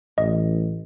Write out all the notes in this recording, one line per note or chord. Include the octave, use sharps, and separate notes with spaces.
A1 D#5